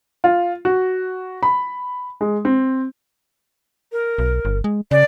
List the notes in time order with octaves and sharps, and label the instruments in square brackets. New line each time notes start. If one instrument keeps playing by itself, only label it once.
[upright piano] F4
F#4
B5
G#3
C4
[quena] A#4
[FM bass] B1
G1
G#3
[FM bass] C#3 [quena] D5